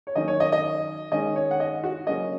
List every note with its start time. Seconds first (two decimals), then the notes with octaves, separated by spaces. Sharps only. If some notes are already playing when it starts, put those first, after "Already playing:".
0.07 C#5
0.15 D#3 F#3 A#3 C#4 D#5
0.28 C#5
0.40 D#5
0.52 D#5
1.12 D#3 G#3 C#4 D#5
1.36 C#5
1.51 F#5
1.60 D#5
1.84 F#4
2.07 C#3 F#3 A#3 C#4 D#5